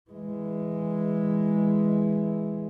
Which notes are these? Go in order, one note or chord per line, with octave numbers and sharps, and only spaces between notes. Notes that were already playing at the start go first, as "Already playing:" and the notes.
E3 G#3